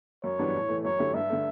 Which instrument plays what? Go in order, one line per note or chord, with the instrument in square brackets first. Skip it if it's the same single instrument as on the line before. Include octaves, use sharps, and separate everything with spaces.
[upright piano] F#2 [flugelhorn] C#5
[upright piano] E3 G3 B3 D4
A2
E3 A3
[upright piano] F#2 [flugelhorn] C#5
[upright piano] D3 A3 E4 G4
[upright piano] G2 [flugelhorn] E5
[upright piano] D3 A3